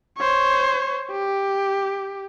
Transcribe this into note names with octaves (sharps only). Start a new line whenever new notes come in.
C5 C#5
G4